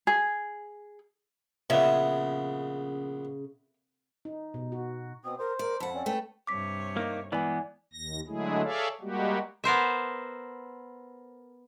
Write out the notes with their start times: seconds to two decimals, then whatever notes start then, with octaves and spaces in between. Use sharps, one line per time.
0.07 G#4
1.70 A#1 C#3 B3 C#5 E5
4.25 D#4
4.54 B2
4.72 F#4
5.24 B2 C4 D#6
5.39 A#4 C5
5.59 A#4 D5
5.80 F2 F#5 A5 B5
5.94 C4 C#4 D5
6.06 A3 B4 G5
6.47 G2 C3 C#5 D6 B6
6.97 A#3 D#4
7.32 E3 G#3 B3 D5 G#5
7.93 D#2 A#6
8.28 D3 F#3 G#3 A3 E4 G#4
8.63 G#4 A4 C#5 D5 E5 F5
9.01 G3 G#3 A#3 F#4 G4
9.64 B3 A#4 C5 E5